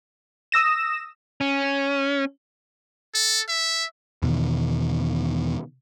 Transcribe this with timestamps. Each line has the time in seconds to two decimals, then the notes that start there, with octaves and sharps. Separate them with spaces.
0.52 D#6 E6 A#6 E7
1.41 C#4
3.15 A4
3.49 E5
4.22 E2 B2 D#3